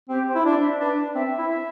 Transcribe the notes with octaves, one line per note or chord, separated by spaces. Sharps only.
C4 G4
C5
E4
D4 D5
E5
D4 B4
C4 E5
E4